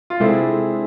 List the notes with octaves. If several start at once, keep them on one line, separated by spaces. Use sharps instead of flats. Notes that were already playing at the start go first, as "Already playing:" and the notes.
F4
C3 G#3 C4 D4 E4 A4
G#4